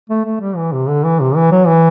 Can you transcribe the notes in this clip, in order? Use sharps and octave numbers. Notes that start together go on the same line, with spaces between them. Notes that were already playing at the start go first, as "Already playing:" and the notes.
A3
A3
G3
E3
C3
D3
E3
C3
E3
F#3
E3